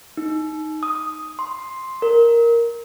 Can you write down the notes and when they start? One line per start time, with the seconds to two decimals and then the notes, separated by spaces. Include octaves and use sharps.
0.17 D#4
0.83 D#6
1.39 C6
2.02 A#4